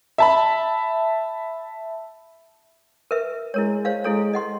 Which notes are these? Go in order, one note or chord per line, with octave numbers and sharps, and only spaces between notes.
E5 A5 B5
A#4 B4 E5
G#3 E4 A#4 C#5
C5 C#5 F5
G#3 E4 A4 C#5
D#5 F#5 C6